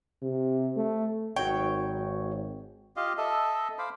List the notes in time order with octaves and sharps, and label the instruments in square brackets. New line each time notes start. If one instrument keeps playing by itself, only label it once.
[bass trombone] C3
A3
[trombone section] G#1 [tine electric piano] F#4 C#5 [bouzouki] G5
[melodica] F4 G4 D#5 F5
A4 D#5 E5
C5 F5 B5 D6